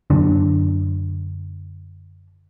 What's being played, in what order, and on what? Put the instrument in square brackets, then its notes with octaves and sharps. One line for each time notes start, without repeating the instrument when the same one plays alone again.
[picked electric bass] F#2 D3 D4